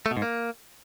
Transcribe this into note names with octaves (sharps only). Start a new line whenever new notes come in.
A3
B2
G#2
A#3